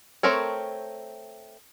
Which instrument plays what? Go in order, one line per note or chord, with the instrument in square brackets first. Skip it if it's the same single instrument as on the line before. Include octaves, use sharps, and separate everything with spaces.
[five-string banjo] A3 C4 A#4 C#5